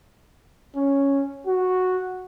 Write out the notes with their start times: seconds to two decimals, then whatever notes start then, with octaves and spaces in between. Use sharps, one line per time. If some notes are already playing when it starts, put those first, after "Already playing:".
0.75 C#4
1.47 F#4